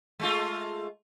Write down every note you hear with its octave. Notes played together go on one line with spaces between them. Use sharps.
G#3 A3 F4